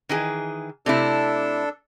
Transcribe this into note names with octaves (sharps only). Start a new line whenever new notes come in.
D#3 E3 G#4
C3 A3 D4 E4 A4